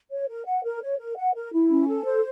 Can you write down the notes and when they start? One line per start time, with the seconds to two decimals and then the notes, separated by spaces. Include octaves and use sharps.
0.12 C#5
0.29 A#4
0.46 F#5
0.64 A#4
0.82 C#5
0.99 A#4
1.17 F#5
1.34 A#4
1.53 E4
1.70 C#4
1.88 A4
2.05 C5